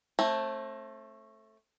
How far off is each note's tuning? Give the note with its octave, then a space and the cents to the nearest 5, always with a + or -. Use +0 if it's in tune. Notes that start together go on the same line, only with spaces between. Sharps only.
A3 +0 C4 +40